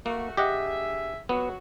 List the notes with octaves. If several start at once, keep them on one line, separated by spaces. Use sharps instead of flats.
A3 A#3 F#4
D3 G4 G#4 D#5 E5 F#5
F2 F#3 B3 F#4